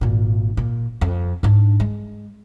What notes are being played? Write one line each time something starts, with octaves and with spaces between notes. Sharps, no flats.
G#1 A#2
A#2
F2
G#2 D4
G#3